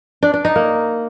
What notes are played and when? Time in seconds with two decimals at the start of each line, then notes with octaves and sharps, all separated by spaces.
0.23 D4
0.34 D4
0.45 D#4
0.56 A#3